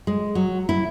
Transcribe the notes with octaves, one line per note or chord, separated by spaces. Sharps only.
G#3
F#3
E4